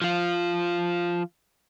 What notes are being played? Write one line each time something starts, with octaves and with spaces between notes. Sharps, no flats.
F3 F4